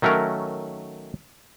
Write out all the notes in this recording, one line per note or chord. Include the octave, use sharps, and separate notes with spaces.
D#3 F#3 A3 C#4 A#4